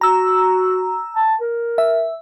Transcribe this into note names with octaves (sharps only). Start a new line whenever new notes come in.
F#4 A#5 E6
A5
A#4
E5